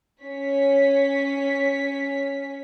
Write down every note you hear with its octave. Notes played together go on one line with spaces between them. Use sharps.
C#4 C#5 B6